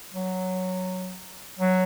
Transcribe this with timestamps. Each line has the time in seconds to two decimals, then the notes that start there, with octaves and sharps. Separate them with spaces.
0.13 F#3
1.59 F#3